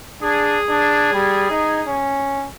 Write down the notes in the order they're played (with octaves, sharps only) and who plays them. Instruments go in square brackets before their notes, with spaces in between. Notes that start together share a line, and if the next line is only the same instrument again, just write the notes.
[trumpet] D4 [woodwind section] G#4
[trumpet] D4
G3
D#4
C#4